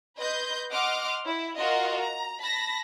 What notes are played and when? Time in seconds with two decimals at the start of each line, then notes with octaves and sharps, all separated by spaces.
0.18 B4 D#5 C6 G6
0.71 D#5 F#5 C6 D6 F6
1.25 E4
1.57 F4 F#4 A#4 D#5 C6
2.00 A#5
2.41 A5 B5 A#6